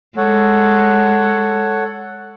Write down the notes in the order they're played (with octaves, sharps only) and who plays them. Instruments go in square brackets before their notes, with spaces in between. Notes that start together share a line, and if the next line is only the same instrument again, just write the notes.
[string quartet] G#3 [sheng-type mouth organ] A4 C#5 F#5